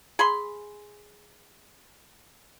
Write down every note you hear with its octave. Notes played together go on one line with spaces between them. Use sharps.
G#4 B5 C6